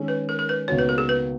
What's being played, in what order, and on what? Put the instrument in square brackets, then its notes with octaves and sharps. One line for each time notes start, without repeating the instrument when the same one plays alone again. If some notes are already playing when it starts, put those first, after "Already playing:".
Already playing: [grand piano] D#3 G#3 C#4
[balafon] B4
A#4
A#4
B4
[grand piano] C#2 B2 A#3 D#4 F#4 [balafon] C#5
[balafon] B4
A#4
G#4
B4